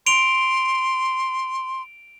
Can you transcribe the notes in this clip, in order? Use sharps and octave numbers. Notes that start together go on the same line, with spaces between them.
C6 D7 F7 G7